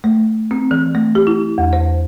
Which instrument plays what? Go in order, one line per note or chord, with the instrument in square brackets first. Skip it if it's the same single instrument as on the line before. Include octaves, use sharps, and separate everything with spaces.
[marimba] A3
C4
E3
A3
G4
E4
E2
C5